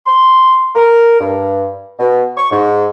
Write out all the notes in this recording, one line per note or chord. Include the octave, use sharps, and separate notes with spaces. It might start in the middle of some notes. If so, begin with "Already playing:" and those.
C6
A#4
G2
B2
C#6
G#2